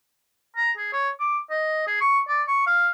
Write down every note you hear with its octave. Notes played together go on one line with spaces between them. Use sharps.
A#5
G#4
C#5
D6
D#5
G#4
C#6
D5
C#6
F5